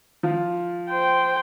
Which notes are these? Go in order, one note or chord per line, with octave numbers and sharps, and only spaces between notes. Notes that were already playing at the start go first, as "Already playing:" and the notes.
F3 F4
C5 G5